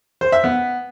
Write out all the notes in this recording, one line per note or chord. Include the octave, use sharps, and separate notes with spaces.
C5
E5
B3